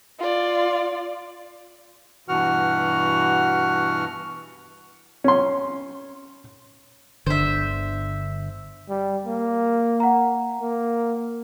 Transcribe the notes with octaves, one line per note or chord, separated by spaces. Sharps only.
F4 D5
G2 B2 E3 F#4 F#5 F6
C#4 C6
G1 D3 C5 E5
G3
A#3
F#5 A#5
A#3